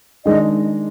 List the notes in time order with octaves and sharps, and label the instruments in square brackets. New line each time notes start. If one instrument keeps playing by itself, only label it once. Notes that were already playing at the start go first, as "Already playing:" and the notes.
[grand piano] D#3 G#3 D4 [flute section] D#5